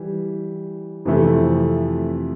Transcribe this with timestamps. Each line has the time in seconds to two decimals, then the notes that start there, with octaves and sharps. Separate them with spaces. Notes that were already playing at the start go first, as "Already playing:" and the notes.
Already playing: E3 G3
1.05 F2 C3 E3 A3